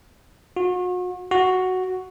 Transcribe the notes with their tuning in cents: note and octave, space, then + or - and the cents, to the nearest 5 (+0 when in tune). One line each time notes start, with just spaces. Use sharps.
F#4 -40
F#4 +0